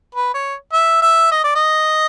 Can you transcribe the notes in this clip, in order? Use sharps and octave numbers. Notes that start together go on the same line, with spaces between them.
B4
C#5
E5
E5
D#5
D5
D#5